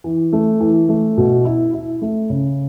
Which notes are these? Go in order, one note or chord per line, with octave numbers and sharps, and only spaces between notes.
E3
A3
E3
A3
B2
E4
E4
A3
C#3